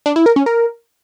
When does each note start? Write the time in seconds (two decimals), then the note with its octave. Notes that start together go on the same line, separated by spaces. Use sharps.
0.06 D4
0.16 E4
0.26 A#4
0.36 C#4
0.46 A#4